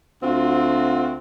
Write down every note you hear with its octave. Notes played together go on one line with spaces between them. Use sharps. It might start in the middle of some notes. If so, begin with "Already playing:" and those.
D2 C4 F4 F#4